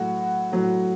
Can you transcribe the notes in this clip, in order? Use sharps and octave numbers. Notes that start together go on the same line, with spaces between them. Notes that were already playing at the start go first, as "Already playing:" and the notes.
Already playing: A2 F#3 F#4
A2 F#3